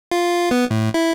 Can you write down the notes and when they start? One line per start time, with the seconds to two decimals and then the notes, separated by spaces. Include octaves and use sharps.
0.11 F4
0.51 B3
0.71 A2
0.94 E4